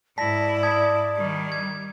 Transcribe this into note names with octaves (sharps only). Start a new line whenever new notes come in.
G#2 E4 D5 A5 A#6 B6
A5 D#6 G#6
D#3 G3
G#6